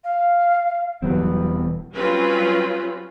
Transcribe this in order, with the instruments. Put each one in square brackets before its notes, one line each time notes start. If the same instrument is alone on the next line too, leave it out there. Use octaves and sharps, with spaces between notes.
[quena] F5
[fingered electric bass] E1 E3 G3 [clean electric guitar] F#3 C4 [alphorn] B3
[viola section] F#3 G3 C4 C#4 F4 B4